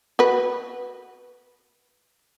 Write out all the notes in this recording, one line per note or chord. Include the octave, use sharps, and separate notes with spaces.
F#4 B4